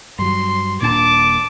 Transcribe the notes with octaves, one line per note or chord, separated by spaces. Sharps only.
G2 F#3 C6
D#1 A#2 D4 A5 D6